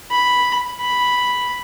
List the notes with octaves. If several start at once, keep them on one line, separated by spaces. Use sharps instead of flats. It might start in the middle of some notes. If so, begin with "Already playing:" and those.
B5
B5